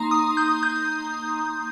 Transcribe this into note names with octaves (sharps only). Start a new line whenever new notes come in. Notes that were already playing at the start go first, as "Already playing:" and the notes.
Already playing: A#3 D#4 A#5 C6
D#6
G6
G6